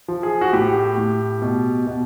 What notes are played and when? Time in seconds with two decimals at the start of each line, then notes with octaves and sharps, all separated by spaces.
0.08 F3
0.23 G#4
0.41 F#4
0.53 A2 G4
0.98 A2
1.42 B2
1.87 B2